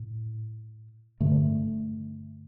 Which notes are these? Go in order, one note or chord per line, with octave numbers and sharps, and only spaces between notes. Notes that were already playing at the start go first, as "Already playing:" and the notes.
Already playing: A2
G2 D3 A3